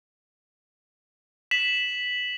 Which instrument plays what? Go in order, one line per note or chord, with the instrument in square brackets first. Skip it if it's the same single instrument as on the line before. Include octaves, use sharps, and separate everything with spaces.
[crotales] B6 E7 F#7